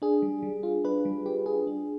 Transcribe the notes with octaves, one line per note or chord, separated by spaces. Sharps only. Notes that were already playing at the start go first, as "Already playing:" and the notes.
D4 G#4
G3
G3
F4
D4 B4
G3
G3 G4
F4 G#4
D4